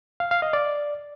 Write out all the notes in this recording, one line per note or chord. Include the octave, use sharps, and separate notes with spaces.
F5
F5
D#5
D5